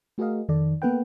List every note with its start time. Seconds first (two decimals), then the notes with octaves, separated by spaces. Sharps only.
0.18 A3 F#4 G#4 A#4 D#5 F5
0.49 F2 D#3 A4 D5
0.82 A#3 B3 A4 B4 F#5 G5